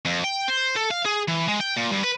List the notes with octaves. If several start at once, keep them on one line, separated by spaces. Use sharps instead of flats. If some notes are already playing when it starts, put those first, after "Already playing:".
F2
G5
C5
A4
F5
G#4
E3
G#3
G5
A#2
G2
B4